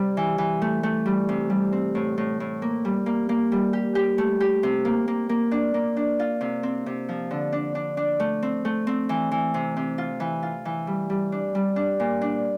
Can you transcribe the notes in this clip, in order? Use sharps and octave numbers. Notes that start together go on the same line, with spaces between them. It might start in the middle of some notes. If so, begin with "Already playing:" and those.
Already playing: C3 G3
E3
E3
A3
A3
G3
C3
G3
C4
A2
A2
A2
A#3
G3
A#3
A#3
G3
G4
G4
A3
G4
C3
A#3
A#3
A#3
D4
A#3
D4
F4
C3
C4
C3
F3
D3
D4
D4
D4
A3
C4
A3
C4
E3
E3
C3
C3
F4
E3
F4
E3
G3
G3
D4
G3
D4
A#2
D4